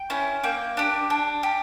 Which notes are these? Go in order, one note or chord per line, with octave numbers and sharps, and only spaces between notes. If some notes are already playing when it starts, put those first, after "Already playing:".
Already playing: G5
C#4 E4
A#3 G5
D4 G4
D4
G4